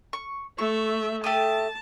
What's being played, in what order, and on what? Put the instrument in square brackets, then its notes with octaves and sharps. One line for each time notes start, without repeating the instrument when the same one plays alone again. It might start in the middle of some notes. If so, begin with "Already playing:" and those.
[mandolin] C#6
[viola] A3 E5 [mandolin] C#6
[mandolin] A3 G4 D#6 [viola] A5